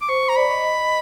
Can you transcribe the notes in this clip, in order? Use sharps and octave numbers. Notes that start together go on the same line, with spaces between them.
D6
C5 C#6
C5
A#5
D5 B5
D#5
D#5